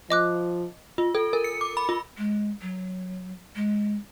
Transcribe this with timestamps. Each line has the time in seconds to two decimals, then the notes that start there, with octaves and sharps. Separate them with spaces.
0.10 F3 D#5 D6 F#6
0.98 F4
1.15 A4
1.33 A#4
1.44 C#7
1.61 D6
1.77 B5
1.89 F4
2.18 G#3
2.62 F#3
3.56 G#3